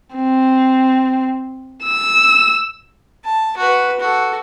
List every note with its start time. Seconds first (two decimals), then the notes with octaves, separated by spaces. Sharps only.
0.16 C4
1.84 E6
3.25 A5
3.57 F#4 B4
4.00 F#4 A4